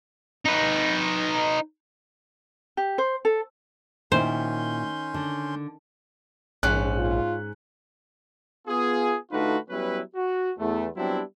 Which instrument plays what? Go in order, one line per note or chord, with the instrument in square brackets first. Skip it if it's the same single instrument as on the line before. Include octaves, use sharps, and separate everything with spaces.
[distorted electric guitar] D#4 B4
[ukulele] G4
C5
A4
[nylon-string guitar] A#2 E4 [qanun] D#3 [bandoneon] C#4 C6 G6 [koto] C5
[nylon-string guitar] D3
[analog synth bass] A#1 [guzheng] G#2 C#4 [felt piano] F#6
[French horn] F4
[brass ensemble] B3 F4 G#4
D3 A3 D#4 F4 F#4 B4
F#3 G3 B3 C#4 E4 B4
F#4
E2 A3
F#3 G3 B3 C4 D4 E4